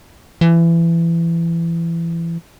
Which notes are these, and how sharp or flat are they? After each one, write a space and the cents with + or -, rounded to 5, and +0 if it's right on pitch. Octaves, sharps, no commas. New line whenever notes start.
E3 +25